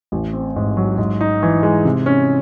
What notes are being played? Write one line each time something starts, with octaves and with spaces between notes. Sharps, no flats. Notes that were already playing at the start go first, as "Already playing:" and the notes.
A1
C4
G#2
F#3
G#2
D#4
E3
G#3
C3
C#4